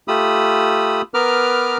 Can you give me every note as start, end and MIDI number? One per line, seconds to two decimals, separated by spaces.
0.08 1.02 57
0.08 1.02 65
0.08 1.02 67
0.08 1.02 83
0.08 1.02 87
0.08 1.02 88
1.14 1.78 59
1.14 1.78 70
1.14 1.78 71
1.14 1.78 82
1.14 1.78 86
1.14 1.78 89